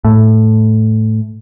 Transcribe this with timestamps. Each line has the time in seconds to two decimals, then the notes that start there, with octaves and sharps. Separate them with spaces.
0.05 A2